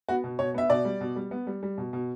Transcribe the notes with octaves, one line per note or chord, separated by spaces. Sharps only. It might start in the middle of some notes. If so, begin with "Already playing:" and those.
B3 F#4
B2
B2 C#5
B3 E5
B2 D5
G3
B2
G3
B3
G3
G3
B2
B2